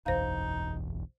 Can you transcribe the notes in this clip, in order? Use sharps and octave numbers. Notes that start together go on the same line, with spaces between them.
F#1 B1 E2 D#4 C5 F5